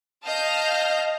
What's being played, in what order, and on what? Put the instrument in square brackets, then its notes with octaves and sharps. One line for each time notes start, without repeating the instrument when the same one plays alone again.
[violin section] D#5 F5 A5 F6 G6 A#6